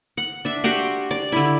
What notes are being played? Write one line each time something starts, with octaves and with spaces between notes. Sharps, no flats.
F#5
D4 E5
F#4 G4 F#5 C6
D5
D3 E4